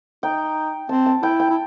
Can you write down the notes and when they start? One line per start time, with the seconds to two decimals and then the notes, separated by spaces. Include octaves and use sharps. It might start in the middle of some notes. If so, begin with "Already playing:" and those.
0.23 D#4 G5
0.89 C4 A5
1.06 A5
1.22 E4 G5
1.40 G5
1.50 E4